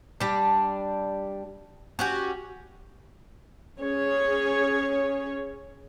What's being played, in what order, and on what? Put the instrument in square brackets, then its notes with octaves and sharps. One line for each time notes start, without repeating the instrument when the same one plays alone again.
[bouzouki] G3 D4
C#4 F#4 G4
[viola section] C#4 G#4 C#5